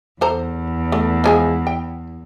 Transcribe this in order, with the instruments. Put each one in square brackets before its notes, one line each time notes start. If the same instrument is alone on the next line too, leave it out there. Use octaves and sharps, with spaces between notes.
[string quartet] E2 [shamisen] A4 C5 A#5
[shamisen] A3
F3 G#3 G#4
G5